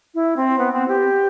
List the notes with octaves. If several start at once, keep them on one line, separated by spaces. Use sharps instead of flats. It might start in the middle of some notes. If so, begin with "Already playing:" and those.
E4
C4
B3
C4
G4